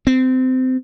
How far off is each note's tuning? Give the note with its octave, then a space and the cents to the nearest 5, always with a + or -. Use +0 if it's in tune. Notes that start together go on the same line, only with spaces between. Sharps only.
C4 -25